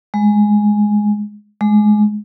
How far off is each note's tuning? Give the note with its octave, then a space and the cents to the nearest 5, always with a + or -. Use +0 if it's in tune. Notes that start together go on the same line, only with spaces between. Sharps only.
G#3 +5
G#3 +20